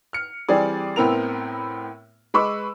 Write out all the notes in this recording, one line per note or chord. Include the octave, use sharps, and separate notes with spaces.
F6 C#7
E3 G3 C4 G#4 D5
A2 B3 C4 E4 A#4 F7
G#3 B4 B5 C#6 D6 E6